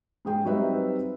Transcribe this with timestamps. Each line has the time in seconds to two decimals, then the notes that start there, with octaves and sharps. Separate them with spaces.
0.25 G#2 G#4 G5
0.44 F#3 G3 C4 D#4 B4 E5